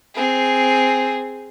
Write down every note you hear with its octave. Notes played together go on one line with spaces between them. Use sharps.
C4 G#4